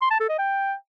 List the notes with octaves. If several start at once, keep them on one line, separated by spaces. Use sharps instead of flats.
C6
A5
A4
D#5
G5